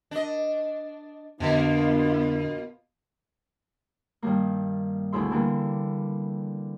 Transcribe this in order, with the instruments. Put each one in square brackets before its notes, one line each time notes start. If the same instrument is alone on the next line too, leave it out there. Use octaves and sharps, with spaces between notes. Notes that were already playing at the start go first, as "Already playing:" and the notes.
[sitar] D4 D#5
[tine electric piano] F2 D3 [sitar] B2 A#3 [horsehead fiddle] B3 F4 [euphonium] D4
[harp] G2 D#3 G3 A#3
D2 B2 E4 G#4 E5 C6
D3 E3 G3 A#3